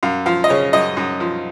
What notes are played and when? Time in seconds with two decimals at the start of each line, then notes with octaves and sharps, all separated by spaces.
0.03 F#2 F5
0.26 F3 F5
0.44 D#5
0.49 C#3 C#5
0.73 F#2 D#5
0.97 F#2
1.20 F3